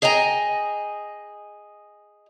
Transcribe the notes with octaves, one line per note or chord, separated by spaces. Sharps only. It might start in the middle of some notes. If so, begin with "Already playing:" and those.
G#4 D#5 G5 G#5 A#5